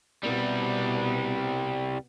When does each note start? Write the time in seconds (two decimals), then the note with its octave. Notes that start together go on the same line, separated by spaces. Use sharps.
0.23 C2 B2 G3 B3